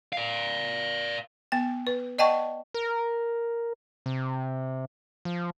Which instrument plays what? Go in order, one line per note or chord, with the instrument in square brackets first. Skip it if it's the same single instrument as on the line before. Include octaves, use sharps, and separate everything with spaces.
[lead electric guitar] D5 F5
[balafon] B3 G5
B4
D5 D#5 F#5 G5 A5 C#6
[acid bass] A#4
C3
F3